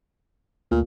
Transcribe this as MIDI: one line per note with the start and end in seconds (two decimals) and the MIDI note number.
0.71 0.83 38
0.71 0.80 46
0.71 0.83 57